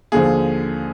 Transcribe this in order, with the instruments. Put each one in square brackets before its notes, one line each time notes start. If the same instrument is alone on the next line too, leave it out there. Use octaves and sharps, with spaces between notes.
[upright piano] D#2 D3 F3 G#4